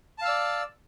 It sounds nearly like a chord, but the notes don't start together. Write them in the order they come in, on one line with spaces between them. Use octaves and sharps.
A5 F5 E6 D5